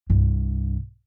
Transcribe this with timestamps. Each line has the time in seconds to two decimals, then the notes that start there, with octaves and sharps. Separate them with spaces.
0.10 C2 G2